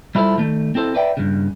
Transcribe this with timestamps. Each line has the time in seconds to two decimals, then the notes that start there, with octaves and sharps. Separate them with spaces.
0.15 G3 E4 F4 A4 C5
0.37 D#3 A3
0.75 C4 E4 A4 C5
0.95 B4 D5 E5 G5
1.17 G2 C#3